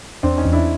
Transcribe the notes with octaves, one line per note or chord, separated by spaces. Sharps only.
E2 C4 D4
C#4 D#4
E2
D4 E4